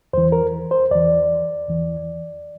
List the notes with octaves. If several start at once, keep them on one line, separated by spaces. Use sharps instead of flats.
E2 E3 C5
A#4
C5
E2 E3 D5
E2 E3